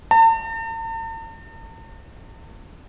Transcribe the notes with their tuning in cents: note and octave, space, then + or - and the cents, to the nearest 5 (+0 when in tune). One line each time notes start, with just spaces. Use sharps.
A5 +45